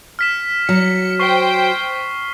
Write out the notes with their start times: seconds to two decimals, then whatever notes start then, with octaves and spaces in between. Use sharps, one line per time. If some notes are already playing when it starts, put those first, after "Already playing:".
0.19 F6 B6 E7
0.69 F#3 C#7
1.20 C5 G5 C#6 C7 G7